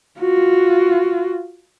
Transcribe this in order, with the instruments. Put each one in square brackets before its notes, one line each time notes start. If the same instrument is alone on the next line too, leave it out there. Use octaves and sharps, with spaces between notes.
[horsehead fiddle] F4 F#4